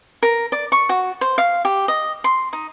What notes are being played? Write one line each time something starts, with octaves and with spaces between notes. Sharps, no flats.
A#4
D5
C#6
F#4
C5
F5
G4
D#5
C6
D#4